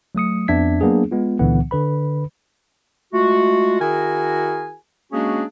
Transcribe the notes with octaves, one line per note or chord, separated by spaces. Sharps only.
F#3 A3 D#6 C#7
F2 B3 D4 E5 G#6 B6
F#3 A#3 B3 D4 G#4
G#3 B3 F4
C#2 A#2 D3 E3 B3 F#5
D3 B4 B5
G#3 A3 F4 F#4
D#3 E4 F#4 G#4 A#4 G#5
G#3 A#3 C#4 D4 F#4 G#4